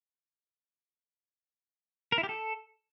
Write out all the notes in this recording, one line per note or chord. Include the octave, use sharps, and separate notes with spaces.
A#4
E4
G4
A4